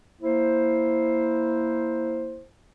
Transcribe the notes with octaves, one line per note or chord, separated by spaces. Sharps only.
A#3 E4 C5